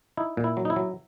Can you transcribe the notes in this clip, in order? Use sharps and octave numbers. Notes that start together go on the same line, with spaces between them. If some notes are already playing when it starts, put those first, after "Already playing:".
D#4 E4
A#2
E4
F#3
D#4
E4
F#3